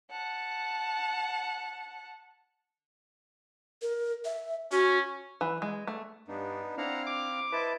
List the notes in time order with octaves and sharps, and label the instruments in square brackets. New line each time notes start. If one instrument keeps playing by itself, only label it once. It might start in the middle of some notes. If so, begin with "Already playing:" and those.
[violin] F#5 A5
[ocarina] A#4
E5
[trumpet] C#4 [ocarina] F#4
[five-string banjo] E3
G#3
A3
[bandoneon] G2 [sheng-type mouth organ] B3 D4 D#4
[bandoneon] C4 F5 F6 [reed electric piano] D4 [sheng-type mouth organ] E4 F#5 A#5
[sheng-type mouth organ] E4 [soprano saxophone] D6
[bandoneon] E4 A5 [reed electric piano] B4 B5 [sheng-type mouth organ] C5 D#5